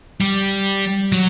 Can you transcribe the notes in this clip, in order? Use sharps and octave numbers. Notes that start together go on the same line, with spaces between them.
G3
F#3